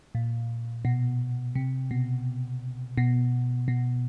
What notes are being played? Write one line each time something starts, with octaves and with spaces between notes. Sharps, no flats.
A#2
B2
C3
B2
B2
B2